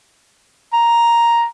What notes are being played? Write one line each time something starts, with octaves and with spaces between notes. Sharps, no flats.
A#5